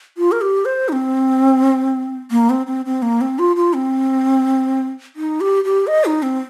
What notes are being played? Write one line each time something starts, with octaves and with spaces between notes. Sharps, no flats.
F4
A#4
G4
C5
D#4
C4
A#3
C4
C4
C4
A#3
C4
F4
F4
C4
D#4
G4
G4
D#5
D#4
C4